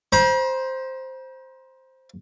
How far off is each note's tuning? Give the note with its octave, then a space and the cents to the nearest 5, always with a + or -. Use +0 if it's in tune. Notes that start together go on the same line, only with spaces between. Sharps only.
C5 +0 A#5 +45